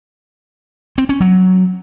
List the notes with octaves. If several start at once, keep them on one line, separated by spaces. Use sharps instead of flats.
C4
C#4
F#3